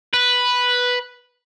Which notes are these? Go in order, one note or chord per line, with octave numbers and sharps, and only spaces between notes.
B4